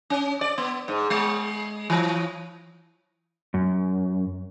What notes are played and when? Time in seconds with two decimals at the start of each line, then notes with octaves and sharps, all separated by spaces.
0.10 C#4
0.41 D5
0.58 B3
0.88 G#2
1.10 G#3
1.90 E3
3.54 F#2